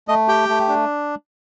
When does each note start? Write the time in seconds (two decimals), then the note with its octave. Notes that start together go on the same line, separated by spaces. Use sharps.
0.08 A3 D#5
0.28 G4 G5
0.49 A3
0.69 D4